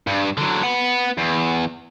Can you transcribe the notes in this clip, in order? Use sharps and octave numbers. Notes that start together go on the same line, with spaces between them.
G2
D3 F#3
B3 F#5
E2